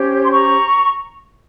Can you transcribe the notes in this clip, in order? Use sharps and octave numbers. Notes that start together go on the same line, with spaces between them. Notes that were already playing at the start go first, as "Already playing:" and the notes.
Already playing: C#4 G4 C5
C6
A#5 C#6